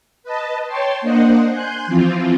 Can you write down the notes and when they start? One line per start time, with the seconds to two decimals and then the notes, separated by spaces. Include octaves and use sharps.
0.23 B4 D#5 A5
0.66 C#5 G5 A5 C6
1.02 A#3 D4 C5 D#5 F#5
1.51 G#5 C6 F#6 G6
1.87 E3 F3 C4 F4